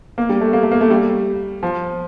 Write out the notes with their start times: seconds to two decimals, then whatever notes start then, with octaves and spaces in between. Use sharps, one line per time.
0.18 A#3
0.29 G3
0.41 A3
0.53 A#3
0.63 A3
0.72 A#3
0.81 A3
0.90 G3
1.63 F3